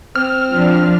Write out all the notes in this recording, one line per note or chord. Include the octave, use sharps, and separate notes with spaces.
C4 F6
F3 D4